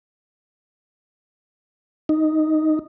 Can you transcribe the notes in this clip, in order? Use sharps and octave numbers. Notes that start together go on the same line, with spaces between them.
D#4